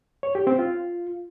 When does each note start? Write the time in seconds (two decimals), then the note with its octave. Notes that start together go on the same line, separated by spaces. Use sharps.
0.23 C#5
0.35 G4
0.47 C4
0.59 F4